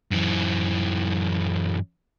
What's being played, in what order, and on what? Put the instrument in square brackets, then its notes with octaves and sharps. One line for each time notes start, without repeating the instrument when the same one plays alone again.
[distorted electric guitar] F#2 E3